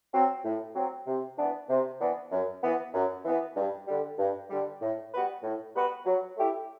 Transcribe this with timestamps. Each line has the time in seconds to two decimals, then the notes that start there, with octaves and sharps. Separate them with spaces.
0.13 F#3 C4
0.45 A2
0.75 F#3 C4
1.07 C3
1.38 E3 B3 D4
1.69 C3
2.00 E3 B3 D4
2.32 F#2
2.63 E3 B3
2.94 F#2
3.25 E3 B3
3.56 G2
3.88 D3 G3
4.19 G2
4.50 D3 G3
4.82 A2
5.13 G3 B3 F#4 B4
5.43 A2
5.74 G3 B3 F#4 B4
6.06 F#3
6.37 A3 E4 G4